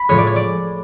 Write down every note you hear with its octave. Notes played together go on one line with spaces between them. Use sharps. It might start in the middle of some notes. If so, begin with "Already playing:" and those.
Already playing: B5
A2 F3 G#3 C#5
D5
C#5
D5